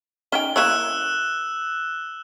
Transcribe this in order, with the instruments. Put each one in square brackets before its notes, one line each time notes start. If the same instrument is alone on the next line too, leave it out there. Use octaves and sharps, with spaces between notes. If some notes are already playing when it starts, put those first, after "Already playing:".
[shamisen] C#4 D#4 G5 [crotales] G7
[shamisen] A#3 E4 C#5 [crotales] E6 F#6 E7